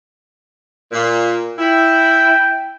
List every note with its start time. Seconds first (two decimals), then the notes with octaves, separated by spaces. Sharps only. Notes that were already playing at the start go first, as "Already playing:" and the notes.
0.91 A#2
1.59 E4 G5